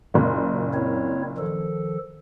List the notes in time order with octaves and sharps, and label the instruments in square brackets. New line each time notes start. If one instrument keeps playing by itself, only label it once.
[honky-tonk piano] F#1 A#2
[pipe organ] C4 E4 C#5
D#3 F3 A4